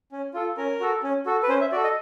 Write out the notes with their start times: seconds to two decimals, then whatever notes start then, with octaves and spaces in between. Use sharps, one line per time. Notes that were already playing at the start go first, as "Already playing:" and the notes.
0.12 C#4
0.34 F4 A4
0.57 C#4 A#4
0.80 F#4 A4
1.03 C#4
1.26 F#4 A4
1.43 B4
1.49 C#4 C5
1.61 E5
1.72 F#4 A4 D5
1.84 D#5